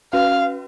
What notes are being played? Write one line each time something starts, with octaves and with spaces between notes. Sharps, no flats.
C#4 F#4 B4 F5